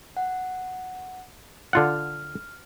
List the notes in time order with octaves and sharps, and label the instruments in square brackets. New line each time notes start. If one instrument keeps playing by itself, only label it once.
[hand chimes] F#5
[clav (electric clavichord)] D3 F4 F#5 [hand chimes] F6